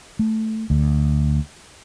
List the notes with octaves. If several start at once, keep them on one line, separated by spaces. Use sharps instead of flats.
A3
D2